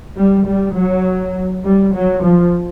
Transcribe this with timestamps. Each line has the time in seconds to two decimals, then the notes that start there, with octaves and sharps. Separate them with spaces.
0.17 G3
0.46 G3
0.76 F#3
1.64 G3
1.94 F#3
2.23 F3